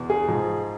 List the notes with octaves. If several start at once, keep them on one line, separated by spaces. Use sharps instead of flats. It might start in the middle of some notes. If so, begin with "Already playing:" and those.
Already playing: E2 B2
G#4
G#2 F3